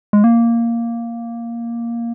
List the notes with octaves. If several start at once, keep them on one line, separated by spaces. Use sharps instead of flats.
G#3
A#3